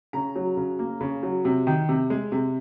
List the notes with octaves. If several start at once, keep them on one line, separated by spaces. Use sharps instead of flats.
C#3 A#5
F#3
C#3
A#3
C#3
F#3
C3
D#3
C3
G#3
C3